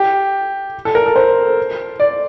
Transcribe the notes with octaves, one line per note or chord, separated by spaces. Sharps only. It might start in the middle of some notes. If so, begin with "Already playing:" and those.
Already playing: G4
A4
A#4
A4
C5
D5